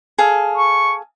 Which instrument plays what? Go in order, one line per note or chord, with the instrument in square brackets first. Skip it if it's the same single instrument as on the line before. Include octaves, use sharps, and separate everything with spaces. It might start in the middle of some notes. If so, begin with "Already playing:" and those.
[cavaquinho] G#4 A4 F5
[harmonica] C#6